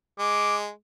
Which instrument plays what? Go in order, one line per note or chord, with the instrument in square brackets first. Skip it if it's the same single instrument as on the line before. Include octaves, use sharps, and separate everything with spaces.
[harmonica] G#3 [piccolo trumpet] D6